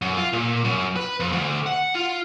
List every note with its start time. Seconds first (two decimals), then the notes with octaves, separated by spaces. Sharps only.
0.02 F#2
0.17 F4
0.33 A#2
0.64 F#2
0.96 B4
1.20 F2
1.32 D2
1.66 F#5
1.95 F4